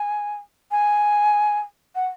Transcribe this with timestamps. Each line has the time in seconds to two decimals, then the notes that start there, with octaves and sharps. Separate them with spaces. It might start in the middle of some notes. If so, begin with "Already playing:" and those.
Already playing: G#5
0.71 G#5
1.95 F#5